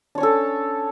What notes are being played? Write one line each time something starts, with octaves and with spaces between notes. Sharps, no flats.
C#4 D4 A4 C#5